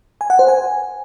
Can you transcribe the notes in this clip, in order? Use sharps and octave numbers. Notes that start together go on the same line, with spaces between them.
G#5
F#5
C5
G#5